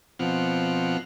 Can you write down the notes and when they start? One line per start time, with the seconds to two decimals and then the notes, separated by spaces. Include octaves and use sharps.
0.19 B2 F3 C4 F#5 F6